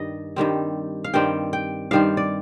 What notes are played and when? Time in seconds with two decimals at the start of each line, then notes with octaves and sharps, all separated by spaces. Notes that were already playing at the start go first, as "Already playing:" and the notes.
Already playing: G2 D#3 G3 D#5
0.36 G2 D#3 G3 C4
1.04 F5
1.14 G2 D#3 G3 C4 G5
1.53 G5
1.91 G2 D#3 G3 C4 F5
2.17 D5